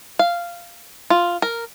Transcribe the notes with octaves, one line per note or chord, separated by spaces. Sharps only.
F5
F4
A#4